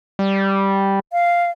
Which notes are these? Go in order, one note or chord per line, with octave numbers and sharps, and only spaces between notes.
G3
F5